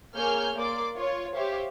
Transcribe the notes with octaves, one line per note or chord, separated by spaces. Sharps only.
A#3 G#4 C#5 G#5 F6 G6
A#3 D5 C6 D6
F4 C#5
G4 C5 C#5 E5 F5